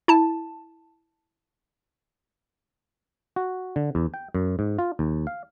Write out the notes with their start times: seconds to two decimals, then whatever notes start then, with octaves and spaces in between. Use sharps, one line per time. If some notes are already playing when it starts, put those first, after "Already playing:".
0.08 E4 A5
3.36 F#4
3.76 D3
3.95 E2
4.14 G5
4.35 F#2
4.59 G#2
4.79 F4
4.99 D#2
5.27 F5